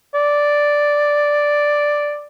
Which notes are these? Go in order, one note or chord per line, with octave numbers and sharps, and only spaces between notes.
D5